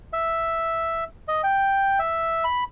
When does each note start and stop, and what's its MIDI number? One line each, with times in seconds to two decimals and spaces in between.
0.13 1.04 76
1.28 1.41 75
1.43 1.99 79
1.99 2.44 76
2.44 2.64 83